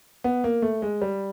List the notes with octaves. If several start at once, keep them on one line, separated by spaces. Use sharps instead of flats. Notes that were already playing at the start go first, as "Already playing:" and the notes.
B3
A#3
A3
G#3
G3